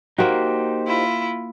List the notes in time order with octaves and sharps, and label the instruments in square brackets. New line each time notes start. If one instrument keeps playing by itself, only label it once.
[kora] A#3 F#4 [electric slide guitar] D#4 G4 C5
[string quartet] E4 F4